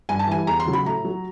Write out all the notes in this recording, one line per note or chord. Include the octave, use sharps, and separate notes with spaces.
G2 G#5
A5
E3 G3 G#5
E2 A#5
C6
C#3 F#3
B5
A2 A#5
F#3